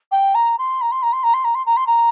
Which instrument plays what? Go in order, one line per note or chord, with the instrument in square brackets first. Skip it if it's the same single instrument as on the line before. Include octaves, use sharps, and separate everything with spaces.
[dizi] G5
A#5
C6
A#5
C6
A#5
C6
A#5
C6
A#5
C6
A#5
C6
A#5